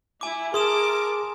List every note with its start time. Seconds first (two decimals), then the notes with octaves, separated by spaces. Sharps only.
0.21 E4 G#5 D6
0.54 G#4 A#4 A5 C6 D6 D#6 E7